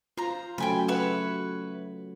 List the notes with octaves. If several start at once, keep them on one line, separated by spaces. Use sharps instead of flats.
F4 C5 A#5
C#3 F#3 A3 G5 G#5 B5
B4 C#5 E5 F#5